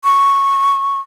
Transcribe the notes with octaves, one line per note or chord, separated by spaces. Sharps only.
C#6